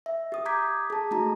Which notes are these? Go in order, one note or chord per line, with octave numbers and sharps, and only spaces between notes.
E5
G4 D#6
A#5 D6 D#6 G6 G#6 B6
G#4 A5
A3 D#4 F#4 A5 A#5